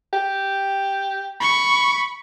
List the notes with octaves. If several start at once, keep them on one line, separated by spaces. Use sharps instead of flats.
G4
B5 C#6